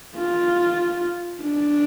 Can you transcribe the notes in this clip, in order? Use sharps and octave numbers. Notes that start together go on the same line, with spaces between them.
F4
D4